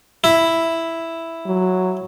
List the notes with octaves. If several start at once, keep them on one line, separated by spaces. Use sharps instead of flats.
E4
F#3